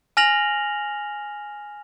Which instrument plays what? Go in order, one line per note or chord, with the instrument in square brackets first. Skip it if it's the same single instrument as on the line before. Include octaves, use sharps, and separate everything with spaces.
[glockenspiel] G#5 F6 A#6 F7 F#7